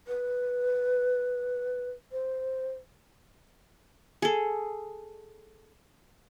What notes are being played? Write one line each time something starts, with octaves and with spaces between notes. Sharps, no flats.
B4
C5
G#4 A4